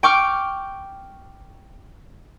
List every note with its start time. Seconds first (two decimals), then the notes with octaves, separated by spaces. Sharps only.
0.03 G5 C#6 D6 F6